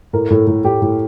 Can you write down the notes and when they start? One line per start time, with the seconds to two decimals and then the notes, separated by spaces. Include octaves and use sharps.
0.13 A2 A#4
0.30 A2
0.47 A2
0.64 A2 G4
0.82 A2